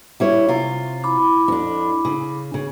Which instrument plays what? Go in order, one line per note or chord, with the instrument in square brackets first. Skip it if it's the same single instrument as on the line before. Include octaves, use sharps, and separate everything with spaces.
[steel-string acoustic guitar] G3 E4 C#5
C3 F4
[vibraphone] E4 B5 D6
[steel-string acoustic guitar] F2 D4
C#3
C#3